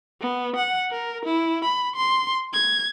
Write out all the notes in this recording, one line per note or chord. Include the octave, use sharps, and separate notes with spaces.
B3
F#5
A#4
E4
B5
C6
G#6